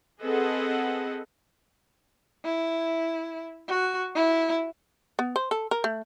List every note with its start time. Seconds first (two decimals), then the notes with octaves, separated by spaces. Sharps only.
0.22 C4 G#4 A4 B4 D#5 F#5
2.44 E4
3.68 F#4
4.15 E4
5.19 B3
5.36 C5
5.51 A4
5.71 A#4
5.84 A3